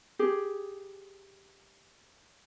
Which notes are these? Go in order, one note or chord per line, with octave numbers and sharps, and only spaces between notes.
G4 G#4